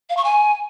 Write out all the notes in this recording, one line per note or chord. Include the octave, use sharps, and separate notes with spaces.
F5
C#6
G#5